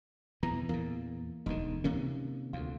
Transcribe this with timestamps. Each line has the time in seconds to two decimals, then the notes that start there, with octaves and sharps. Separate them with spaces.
0.43 E2 B2 E3 A#5
0.69 E2 A#2 A#3
1.46 E1 D2 D3 D#4
1.84 C3 D#3 A#3 C#4
2.53 D2 F4